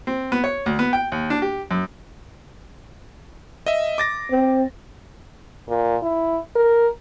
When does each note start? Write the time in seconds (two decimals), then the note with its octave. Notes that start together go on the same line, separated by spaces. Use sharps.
0.07 C4
0.32 B3
0.44 C#5
0.66 D2
0.79 B3
0.93 G5
1.12 D#2
1.30 D4
1.42 G4
1.71 F#2
3.66 D#5 E5
3.98 D6 A6 A#6
4.32 C4
5.69 A#2
6.02 E4
6.55 A#4